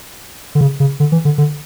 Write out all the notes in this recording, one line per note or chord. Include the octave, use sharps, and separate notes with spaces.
D3
C#3
C#3
D3
E3
D3
D3